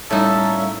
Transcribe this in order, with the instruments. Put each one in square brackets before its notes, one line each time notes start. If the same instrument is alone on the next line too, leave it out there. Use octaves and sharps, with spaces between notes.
[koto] A2 D#4 [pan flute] G3 [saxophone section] A#3 C#4 E5 [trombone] A4